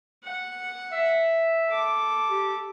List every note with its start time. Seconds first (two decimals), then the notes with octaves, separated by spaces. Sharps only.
0.24 F#5
0.92 E5
1.68 A4 D6
2.30 G4